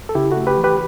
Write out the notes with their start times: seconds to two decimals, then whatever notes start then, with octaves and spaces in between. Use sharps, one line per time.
0.09 A4
0.15 C#3 E4 G4
0.32 F#4 A4
0.37 A3
0.47 G4 B4
0.58 E3
0.64 G4 B4